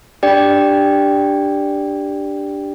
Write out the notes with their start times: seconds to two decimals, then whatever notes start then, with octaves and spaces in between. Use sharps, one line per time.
0.23 D4 G4 D5 G5